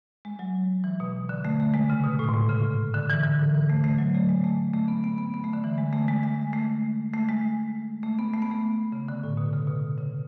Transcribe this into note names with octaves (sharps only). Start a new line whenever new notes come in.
G#3
F#3
E3
B2
D3
A3
A3
G#3
C#3
B2
A2
G#2
A2
C#3
D3
E3
D3
E3
E3
A3
A3
F#3
A3
G#3
A3
A3
B3
B3
B3
B3
A3
D3
E3
G#3
A3
G#3
G#3
A3
A3
G#3
A3
B3
A3
B3
A3
C#3
D3
A2
B2
C#3
B2
C#3